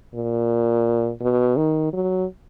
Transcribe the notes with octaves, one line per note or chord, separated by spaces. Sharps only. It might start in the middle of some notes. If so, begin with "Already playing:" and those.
A#2
B2
D#3
F#3